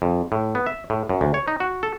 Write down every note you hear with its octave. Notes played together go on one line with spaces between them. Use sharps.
F2
A2
B3
E5
A2
F#2
D2
C#5
D#4
F#4
A4